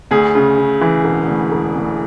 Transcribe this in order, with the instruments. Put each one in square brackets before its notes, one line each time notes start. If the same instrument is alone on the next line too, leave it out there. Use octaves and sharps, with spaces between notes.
[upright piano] D2 G#4
C#3
C#3
E3
E1
D2
E1
D2